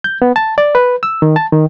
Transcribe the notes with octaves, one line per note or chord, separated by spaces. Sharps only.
G6
B3
A5
D5
B4
E6
D#3
A5
D#3